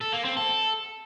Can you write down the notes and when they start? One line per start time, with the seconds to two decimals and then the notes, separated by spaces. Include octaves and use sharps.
0.01 A4
0.13 A#3
0.25 C4
0.37 A4